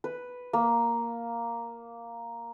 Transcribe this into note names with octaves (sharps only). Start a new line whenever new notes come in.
B4
A#3